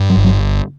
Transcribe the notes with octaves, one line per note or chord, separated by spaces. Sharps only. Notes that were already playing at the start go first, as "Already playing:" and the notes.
Already playing: G2
F#3
G1
F#3